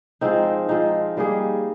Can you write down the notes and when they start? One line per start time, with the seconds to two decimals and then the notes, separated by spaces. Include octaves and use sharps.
0.21 F3 G#3 C4 D#4
0.69 F3 G#3 C4 D#4
1.17 G3 A#3 D#4 G#4